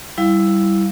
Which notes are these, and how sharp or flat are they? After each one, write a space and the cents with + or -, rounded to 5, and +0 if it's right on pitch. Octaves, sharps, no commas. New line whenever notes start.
G3 -10 E4 +0 F5 +0